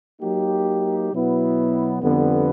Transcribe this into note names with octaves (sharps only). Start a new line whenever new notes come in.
F#3 A#3 D#4 G4
B2 F#3 B3 E4
F2 D3 G3 B3